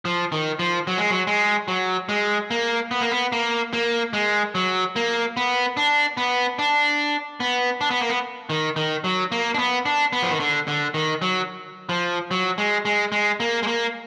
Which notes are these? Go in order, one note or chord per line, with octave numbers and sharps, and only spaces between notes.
F3
D#3
F3
F#3
G#3
F#3
G#3
F#3
G#3
A#3
B3
A#3
B3
A#3
A#3
G#3
F#3
A#3
B3
D4
B3
D4
B3
D4
B3
A#3
B3
D#3
D#3
F#3
A#3
D4
B3
D4
B3
F3
D#3
D3
D3
D#3
F#3
F3
F#3
G#3
G#3
G#3
A#3
G#3
A#3